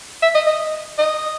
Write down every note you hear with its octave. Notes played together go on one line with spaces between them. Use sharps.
E5
D#5
D#5
D#5